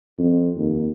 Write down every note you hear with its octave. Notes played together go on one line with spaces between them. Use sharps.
F2
D#2